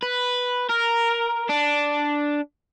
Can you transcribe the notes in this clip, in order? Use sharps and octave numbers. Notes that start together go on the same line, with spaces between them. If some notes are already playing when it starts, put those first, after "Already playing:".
B4
A#4
D4